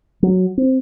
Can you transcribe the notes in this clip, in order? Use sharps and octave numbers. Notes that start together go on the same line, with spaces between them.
F#3
C4